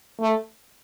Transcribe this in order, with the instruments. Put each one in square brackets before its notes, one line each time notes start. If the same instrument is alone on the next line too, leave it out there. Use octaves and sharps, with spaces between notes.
[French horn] A3